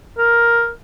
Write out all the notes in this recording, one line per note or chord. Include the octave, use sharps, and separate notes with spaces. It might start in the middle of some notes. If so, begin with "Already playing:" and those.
A#4